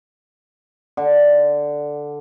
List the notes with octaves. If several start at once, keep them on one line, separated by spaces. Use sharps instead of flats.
D3